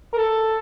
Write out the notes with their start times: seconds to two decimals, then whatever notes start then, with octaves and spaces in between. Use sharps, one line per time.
0.13 A#4
0.18 A4